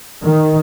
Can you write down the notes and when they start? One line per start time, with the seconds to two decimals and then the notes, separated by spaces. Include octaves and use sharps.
0.24 D#3